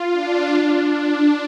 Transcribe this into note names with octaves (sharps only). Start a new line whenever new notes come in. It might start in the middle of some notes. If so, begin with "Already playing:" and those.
Already playing: F4
D4
D4
D4